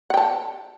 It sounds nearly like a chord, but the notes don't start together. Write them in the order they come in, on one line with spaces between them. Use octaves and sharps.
F#5 G5 A5